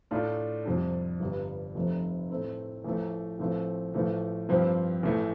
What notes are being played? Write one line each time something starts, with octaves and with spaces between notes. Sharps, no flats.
A2 A3 D4 F4 A4
F2 C3 G3 D4
G1 G2 G3
F1 F2 C3 A3
A2 A3 C4
A1 A2 F3 A3
A1 A2 F3 A3 C4
A1 A2 F3 A3
G2 F3 C4 G4
A1 A2 A3